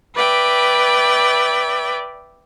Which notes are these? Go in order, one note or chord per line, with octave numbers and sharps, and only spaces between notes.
B4 D5 E5 G5